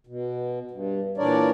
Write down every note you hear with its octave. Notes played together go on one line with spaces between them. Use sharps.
B2
G2
A#2 E3 D4 A#4 C#5 D5